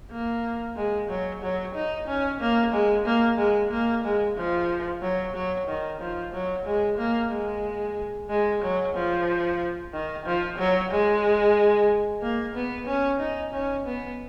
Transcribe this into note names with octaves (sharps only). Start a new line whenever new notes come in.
A#3
G#3
F#3
F#3
D#4
C#4
A#3
G#3
A#3
G#3
A#3
G#3
F3
F#3
F#3
D#3
F3
F#3
G#3
A#3
G#3
G#3
F#3
F3
D#3
F3
F#3
G#3
A#3
B3
C#4
D#4
C#4
B3